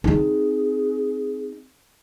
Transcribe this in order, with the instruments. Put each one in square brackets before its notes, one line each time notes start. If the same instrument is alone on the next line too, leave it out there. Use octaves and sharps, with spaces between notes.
[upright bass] C4 D#4 [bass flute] G#4